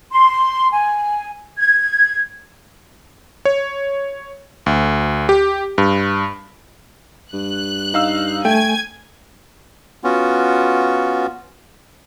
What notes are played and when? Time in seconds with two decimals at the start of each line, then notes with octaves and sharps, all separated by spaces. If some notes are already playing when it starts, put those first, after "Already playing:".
0.11 C6
0.71 G#5
1.58 G#6
3.45 C#5
4.66 D2
5.29 G4
5.78 G2
7.33 G2 F#6
7.94 D#4 F5 E6
8.45 A3 G5 G#5 G#6
10.04 B3 C#4 F4 F#4